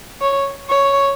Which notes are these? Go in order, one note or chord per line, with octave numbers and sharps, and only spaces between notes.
C#5
C#5